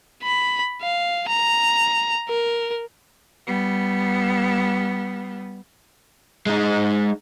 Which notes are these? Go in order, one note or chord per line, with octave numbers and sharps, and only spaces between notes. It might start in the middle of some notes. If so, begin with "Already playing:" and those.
B5
F5
A#5
A#4
G3 B3
G#3 D#4